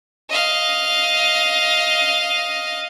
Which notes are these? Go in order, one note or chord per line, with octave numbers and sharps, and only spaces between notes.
D#5 F5